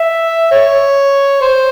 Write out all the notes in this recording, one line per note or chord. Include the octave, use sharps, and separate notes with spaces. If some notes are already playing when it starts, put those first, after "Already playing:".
Already playing: E5
C#5
C5